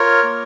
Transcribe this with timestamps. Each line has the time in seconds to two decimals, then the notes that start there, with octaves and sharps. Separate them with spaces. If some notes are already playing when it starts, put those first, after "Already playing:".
Already playing: F4 A#4 C#5
0.23 A#3